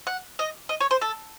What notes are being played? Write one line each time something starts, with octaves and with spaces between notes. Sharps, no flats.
F#5
D#5
D#5
C#5
C5
A4